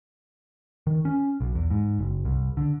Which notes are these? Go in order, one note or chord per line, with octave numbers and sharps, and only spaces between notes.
D#3
C#4
B1
E2
G#2
F#1
C2
D3